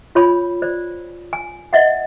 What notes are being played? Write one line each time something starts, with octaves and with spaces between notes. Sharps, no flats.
F4 C#5 B5
C5 D5
G#5
D#5 E5 F#5